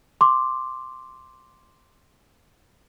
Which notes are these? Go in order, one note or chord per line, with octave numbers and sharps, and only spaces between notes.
C6 D6